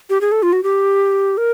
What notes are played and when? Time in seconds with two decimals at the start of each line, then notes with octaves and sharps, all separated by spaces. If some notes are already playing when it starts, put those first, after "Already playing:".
0.10 G4
0.21 G#4
0.32 A4
0.43 F4
0.53 F#4
0.63 G4
1.37 A#4